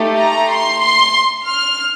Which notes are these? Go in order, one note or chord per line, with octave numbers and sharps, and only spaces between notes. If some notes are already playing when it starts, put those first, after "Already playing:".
Already playing: A3 D#4 G4
A#5
C6
C6
F6